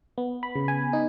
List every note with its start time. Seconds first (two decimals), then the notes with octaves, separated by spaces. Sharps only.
0.18 B3
0.43 B5
0.56 C#3
0.68 G#5
0.93 D#4